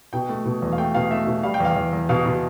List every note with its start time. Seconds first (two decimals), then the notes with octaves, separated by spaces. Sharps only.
0.13 B2 G5
0.29 A3
0.45 B2
0.62 E2
0.73 F5
0.78 A3 G5
0.95 B2 F5
1.11 A3 E5
1.27 B2
1.43 G3 F5
1.54 G5
1.60 E2 F5
1.76 E2
1.93 E2
2.09 B2 F5
2.26 B2